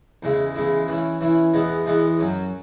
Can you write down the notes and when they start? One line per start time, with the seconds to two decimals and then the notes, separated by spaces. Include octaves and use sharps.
0.23 E2 C#3 G#3 E4
0.55 E2 C#3 G#3 E4
0.88 E3 C#4 E4
1.21 E3 C#4 E4
1.54 E2 E3 G#3 B3
1.86 E2 E3 G#3 B3
2.19 F#2 F#3 C#4